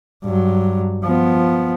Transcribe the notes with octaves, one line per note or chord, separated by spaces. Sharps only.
G2 F#3
F3 B3